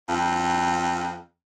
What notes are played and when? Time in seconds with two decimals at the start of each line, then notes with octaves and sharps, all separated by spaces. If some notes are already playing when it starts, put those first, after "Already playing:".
0.09 F2